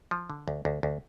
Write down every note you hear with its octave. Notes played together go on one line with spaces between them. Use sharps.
F3
D3
D2
D2
D2